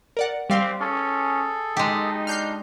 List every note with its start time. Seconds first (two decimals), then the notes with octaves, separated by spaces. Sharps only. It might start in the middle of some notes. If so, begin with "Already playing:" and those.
0.17 A#4 D5 F#5
0.50 G3 C4 G4 F5 C6
0.81 C#4 G#4 A4
1.77 G#3 D#4 G4
2.27 D4 F6 G6 C7